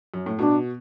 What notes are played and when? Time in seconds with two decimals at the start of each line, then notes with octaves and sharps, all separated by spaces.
0.14 F#2
0.26 A2
0.39 B2 D4